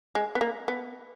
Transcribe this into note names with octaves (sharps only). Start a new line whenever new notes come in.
G#3
B3
A#3
B3